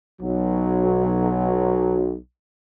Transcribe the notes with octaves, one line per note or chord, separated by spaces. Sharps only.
B1 F#3